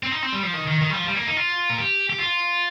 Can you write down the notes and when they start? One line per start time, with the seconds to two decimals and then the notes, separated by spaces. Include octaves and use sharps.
0.03 C4
0.11 D#4
0.23 C4
0.33 G3
0.43 F3
0.53 D#3
0.67 D#3
0.81 D#3
0.90 G3
0.95 F3
1.05 G3
1.15 A#3
1.26 D#4
1.37 F4
1.70 A#4
1.78 G4
2.10 G4
2.19 F4